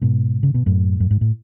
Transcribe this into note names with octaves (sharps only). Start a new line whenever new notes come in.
G#2 B2
C#3
B2
F#2 A2
F#2
G#2
A2